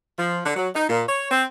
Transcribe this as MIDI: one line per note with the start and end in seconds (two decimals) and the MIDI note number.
0.17 0.39 53
0.44 0.55 50
0.56 0.68 54
0.74 0.84 63
0.89 1.03 46
1.08 1.29 73
1.31 1.43 60